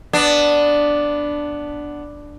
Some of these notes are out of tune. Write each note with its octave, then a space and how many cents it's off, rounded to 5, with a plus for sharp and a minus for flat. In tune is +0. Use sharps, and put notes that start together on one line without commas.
B3 +0 D4 +0